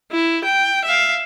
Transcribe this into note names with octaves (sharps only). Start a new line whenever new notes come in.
E4
G5
E5 F5